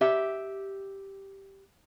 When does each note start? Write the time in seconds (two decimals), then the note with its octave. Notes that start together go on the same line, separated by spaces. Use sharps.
0.01 G4 E5